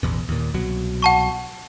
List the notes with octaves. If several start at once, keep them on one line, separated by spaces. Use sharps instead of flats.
A1 E2 B2
D#2 A#2
C2 B2 F#3
F#5 A5 C#6